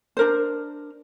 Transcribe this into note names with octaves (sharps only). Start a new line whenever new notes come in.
D4 A#4 C5